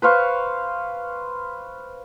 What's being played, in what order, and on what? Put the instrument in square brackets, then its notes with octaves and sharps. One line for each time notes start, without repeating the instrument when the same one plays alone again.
[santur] B4 C5 F5 C#6